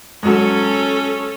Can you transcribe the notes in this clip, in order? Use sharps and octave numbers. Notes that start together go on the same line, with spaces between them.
G#2 F#3 C#4 A4